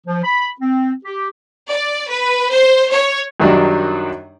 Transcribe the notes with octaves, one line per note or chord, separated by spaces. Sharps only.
F3
B5
C4
G4
D5
B4
C5
C#5
F#2 D#3 F#3 G3 D4 D#4